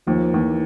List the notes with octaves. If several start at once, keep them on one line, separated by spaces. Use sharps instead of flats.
D#2 F3
D#2 E3